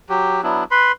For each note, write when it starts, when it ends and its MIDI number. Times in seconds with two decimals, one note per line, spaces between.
0.09 0.41 54
0.09 0.41 67
0.43 0.64 54
0.43 0.64 59
0.43 0.64 62
0.43 0.64 64
0.71 0.92 71
0.71 0.92 83
0.71 0.92 84